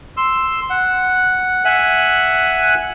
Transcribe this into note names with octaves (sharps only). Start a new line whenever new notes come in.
C6 E6
F#5
E5 F#5 G#5 F#6